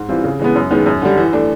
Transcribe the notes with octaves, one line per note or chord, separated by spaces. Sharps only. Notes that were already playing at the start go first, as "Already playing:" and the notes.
Already playing: G#2
E3 G3 C4 F4
C#3
E3 G#3 B3
F#2
D#3 G#3 B3
F#2
D3 G3
E3
A3 D4